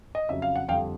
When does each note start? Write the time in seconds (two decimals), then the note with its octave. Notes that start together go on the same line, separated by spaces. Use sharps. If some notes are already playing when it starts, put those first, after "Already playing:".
0.15 D#5
0.29 F2 C#3 F#3 E5
0.42 F5
0.56 F#5
0.68 F2 D3 G3 C4 F5 G5